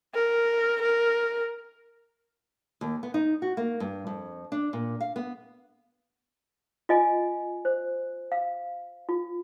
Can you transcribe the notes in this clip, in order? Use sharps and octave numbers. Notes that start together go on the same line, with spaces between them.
A#4
A#4
D#2
B3
D#4
F#4
A#3
G2
F2
D4
A#2
F5
B3
F4 D#5 G#5
C5
F5
F4